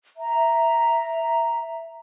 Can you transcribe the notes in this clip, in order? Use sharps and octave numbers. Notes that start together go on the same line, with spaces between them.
E5 A#5